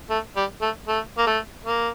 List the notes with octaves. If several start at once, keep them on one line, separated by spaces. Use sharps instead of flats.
A3
G3
A3
A3
A#3
A3
A#3